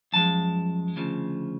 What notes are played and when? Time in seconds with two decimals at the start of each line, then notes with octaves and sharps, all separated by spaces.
0.13 F#2 F3 G#3 A5
0.96 D2 C#3 F3